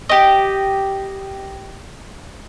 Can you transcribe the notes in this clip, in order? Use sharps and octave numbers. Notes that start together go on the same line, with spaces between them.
G4 D#5